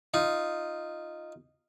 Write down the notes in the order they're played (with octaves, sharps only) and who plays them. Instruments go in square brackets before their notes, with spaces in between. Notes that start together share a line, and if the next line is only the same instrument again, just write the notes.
[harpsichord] D#4 F4